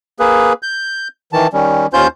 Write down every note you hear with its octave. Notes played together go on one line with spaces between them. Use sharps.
A#3 G#4 B4
G6
D#3 E3 A5
D#3 G3 C#4
D#2 C#4 F4 C5 G6